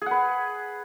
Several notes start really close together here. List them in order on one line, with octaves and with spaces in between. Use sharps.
G#4 F#5 B4